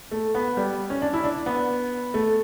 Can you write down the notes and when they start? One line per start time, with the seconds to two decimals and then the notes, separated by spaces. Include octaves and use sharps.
0.11 A3
0.35 B3
0.57 G3
0.90 C#4
1.02 D4
1.13 E4
1.24 D4
1.46 B3
2.14 A3